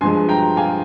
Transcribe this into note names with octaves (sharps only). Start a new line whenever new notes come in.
G2 F3 G#3 G#5 C6
G5 A#5
F5 G#5